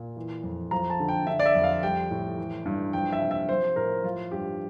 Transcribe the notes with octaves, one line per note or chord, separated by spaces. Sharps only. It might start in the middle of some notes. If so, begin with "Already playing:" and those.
Already playing: A#2
E3
F2
F3 A#5
A5
D3
G5
D3 E5
D5
E5
F2
F5
G3 G5
A2
E3
G2
F3 G5
E5
C3
E5
F3 C5
A2 A#4
F3 F4
G2 G4